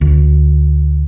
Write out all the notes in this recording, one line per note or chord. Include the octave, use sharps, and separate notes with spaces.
D2